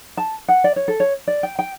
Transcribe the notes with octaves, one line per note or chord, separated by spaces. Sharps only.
A5
F#5
D5
C#5
A4
C#5
D5
G5
G5